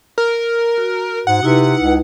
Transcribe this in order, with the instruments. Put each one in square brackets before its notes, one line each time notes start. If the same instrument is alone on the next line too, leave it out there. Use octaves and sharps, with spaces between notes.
[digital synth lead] A#4
[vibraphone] F#4
[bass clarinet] G#2 [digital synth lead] F#5
[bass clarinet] C3 [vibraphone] D#4 E4 B4
[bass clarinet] C#2